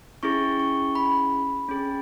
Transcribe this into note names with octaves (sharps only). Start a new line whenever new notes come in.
C#4 E4 G#4 C#6
C#6
B5
C#4 G#4